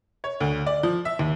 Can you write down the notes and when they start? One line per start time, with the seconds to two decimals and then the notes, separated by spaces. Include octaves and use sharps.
0.24 C#5
0.40 D2
0.66 D5
0.83 F3
1.05 E5
1.19 D#2